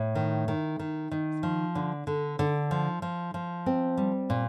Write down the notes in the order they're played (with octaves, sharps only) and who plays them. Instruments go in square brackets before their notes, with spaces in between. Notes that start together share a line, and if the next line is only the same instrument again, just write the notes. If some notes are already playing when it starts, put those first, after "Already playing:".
Already playing: [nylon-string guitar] A2
D#3
D#3
D#3
D#3
F3
D3
D3
D3
F3
F3
F3
C4
G3
A#2